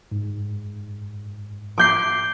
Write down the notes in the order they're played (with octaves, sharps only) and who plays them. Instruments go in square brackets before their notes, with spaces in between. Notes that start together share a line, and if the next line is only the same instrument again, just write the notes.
[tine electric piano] G#2
[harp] D6 G6 C7